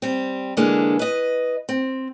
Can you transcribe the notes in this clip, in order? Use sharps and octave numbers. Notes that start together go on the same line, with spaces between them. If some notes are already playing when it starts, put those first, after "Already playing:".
G3 C4
D3 E3 G#3 A#3 D4
B4 D#5
C4